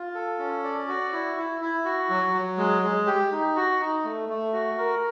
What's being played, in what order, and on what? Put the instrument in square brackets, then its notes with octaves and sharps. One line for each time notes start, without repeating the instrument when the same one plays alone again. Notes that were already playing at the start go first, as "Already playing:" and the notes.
Already playing: [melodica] F4
A4
C#4
D5
F#4
E4
E4
E4
F#4
F#3
F#3
G#3
G#3
G4
D#4
F#4
D#4
A3
A3
F#4
A#4